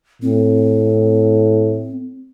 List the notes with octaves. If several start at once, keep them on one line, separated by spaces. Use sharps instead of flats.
A2 C4